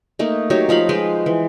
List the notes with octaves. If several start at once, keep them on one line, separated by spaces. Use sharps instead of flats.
A3 A#3 D#4
F#3 D#4 G4 C#5
F3 D#4 F5 B5
G#3 B4 G5 C6
E3